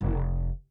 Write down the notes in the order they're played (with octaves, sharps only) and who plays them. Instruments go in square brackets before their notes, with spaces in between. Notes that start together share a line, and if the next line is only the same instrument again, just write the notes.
[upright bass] F1